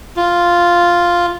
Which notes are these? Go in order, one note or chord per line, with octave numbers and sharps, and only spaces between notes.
F4